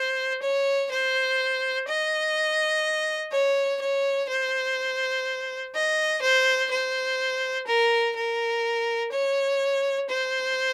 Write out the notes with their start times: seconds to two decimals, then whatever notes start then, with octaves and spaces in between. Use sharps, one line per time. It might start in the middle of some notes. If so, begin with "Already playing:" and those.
Already playing: C5
0.42 C#5
0.91 C5
1.88 D#5
3.32 C#5
3.81 C#5
4.29 C5
5.75 D#5
6.22 C5
6.71 C5
7.67 A#4
8.16 A#4
9.12 C#5
10.10 C5